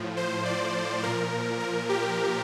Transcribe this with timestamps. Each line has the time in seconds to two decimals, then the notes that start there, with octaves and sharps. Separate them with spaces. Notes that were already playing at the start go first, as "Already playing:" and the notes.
Already playing: A2 F3
0.17 C5
0.45 D5
1.02 A#2 F3 A#4
1.60 A#4
1.89 G4